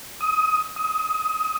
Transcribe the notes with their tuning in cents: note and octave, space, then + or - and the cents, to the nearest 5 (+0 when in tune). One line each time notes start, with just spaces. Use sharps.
D#6 +25
D#6 +30